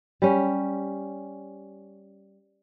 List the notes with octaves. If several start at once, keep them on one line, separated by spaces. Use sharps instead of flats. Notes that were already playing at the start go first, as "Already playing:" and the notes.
G3 C#4